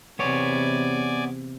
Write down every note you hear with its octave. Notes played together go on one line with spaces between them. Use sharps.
E2 C3 B3 C#5 D5 G#5